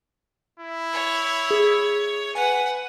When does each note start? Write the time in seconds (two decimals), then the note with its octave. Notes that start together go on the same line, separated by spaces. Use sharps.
0.60 E4
0.93 C#5
1.51 G#4
2.35 B4 F#5 G#5